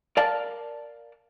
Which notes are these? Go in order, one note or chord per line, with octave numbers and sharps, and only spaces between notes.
A#4 D5 F5 A5